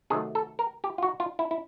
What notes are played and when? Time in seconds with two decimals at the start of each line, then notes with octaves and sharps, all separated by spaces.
0.10 C3 D#3 F#3 A3 G#4
0.35 A4
0.59 A#4
0.84 G4
0.98 F4
1.03 F#4
1.20 F4
1.39 E4
1.51 E4